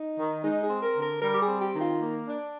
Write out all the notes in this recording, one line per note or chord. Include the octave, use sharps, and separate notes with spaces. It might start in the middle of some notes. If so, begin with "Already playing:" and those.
Already playing: D#4
D#3
G#3 D#4
G#4
C4
A#4
D3
A#4
G3 A#4
G4
G#4
C4
G4
D#3
F4
A#3
D4